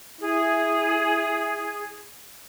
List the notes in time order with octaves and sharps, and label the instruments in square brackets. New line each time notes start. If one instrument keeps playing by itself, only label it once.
[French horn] E4 [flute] G#4